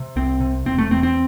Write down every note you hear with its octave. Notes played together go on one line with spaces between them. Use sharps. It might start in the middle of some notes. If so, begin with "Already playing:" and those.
Already playing: C3
C2 C4
C3
E1 C4
A3
E2 C4
C4